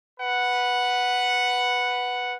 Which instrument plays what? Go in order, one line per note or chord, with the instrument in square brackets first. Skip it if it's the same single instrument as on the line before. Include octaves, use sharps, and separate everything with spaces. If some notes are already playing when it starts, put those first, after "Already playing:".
[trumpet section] B4 F#5